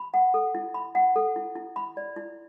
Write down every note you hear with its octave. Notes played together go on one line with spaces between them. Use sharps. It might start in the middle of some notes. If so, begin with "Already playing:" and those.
Already playing: B5
F#5
A4
E4
B5
F#5
A4
E4
E4
B5
D5
E4